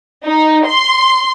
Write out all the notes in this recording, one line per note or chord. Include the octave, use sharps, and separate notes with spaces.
D#4
C6